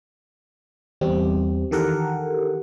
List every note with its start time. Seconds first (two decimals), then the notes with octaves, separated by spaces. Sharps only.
1.01 E2 G3 C4 G4
1.71 D#3 E3 G4 A4 A#4 F#5